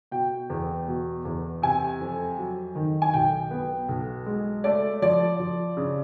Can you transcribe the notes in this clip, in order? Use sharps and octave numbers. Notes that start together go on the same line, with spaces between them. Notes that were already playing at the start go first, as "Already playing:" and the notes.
B2 G5
E2
B2
E2
C3 G#5
F2
F#3
D#3
G#5
B1 G5
B3
B1
G#3
A3 D5
F3 D5
F3
C#3